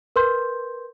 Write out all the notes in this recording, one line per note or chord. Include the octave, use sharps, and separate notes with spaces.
A#4 B4 C6 G6